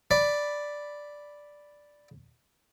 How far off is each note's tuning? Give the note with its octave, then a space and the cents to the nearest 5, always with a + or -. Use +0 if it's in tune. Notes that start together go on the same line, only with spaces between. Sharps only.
D5 +0 B5 +0